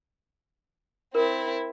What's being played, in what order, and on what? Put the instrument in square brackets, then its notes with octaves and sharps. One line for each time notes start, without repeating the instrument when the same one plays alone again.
[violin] C4 E4 [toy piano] A#4